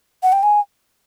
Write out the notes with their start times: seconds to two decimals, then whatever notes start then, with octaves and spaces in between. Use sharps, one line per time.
0.23 F#5
0.32 G5
0.43 G#5